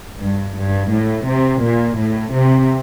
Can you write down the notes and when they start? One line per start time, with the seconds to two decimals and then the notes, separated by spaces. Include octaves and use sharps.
0.20 G2
0.56 G2
0.92 A2
1.27 C3
1.62 A#2
1.98 A2
2.33 C3